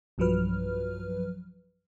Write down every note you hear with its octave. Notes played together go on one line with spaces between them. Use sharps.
B1 G2 F3 F#3 B4 F6